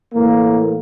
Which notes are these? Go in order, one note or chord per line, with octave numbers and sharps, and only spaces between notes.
A2 E3 A#3